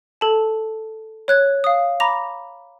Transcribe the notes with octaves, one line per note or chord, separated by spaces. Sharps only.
A4 A5
C#5 F#6 G#6
F5 D#6
A#5 B5 D6 A#6 F7